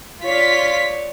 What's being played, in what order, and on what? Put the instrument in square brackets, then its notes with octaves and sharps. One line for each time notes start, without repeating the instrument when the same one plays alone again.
[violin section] F4 B6 [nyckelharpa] C#5 D5